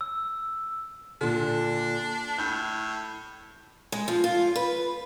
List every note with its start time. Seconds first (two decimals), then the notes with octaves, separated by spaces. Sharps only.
0.01 E6
1.21 A#2 D3 D4
2.38 A2 G6
3.92 G#3
4.08 F3
4.24 F4
4.56 B4